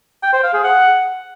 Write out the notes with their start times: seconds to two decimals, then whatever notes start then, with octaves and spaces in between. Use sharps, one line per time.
0.23 G5
0.33 C5
0.43 F5
0.54 G#4
0.64 F#5